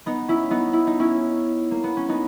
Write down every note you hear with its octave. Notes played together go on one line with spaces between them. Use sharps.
B3 D#4
C#4 E4
B3 D#4
E4
D#4
C#4 E4
A#3
B3
C#4
B3 D#4